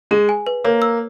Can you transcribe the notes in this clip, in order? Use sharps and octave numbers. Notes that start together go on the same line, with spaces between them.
G#3 G#4
G#5
B4
A#3 C#5
E6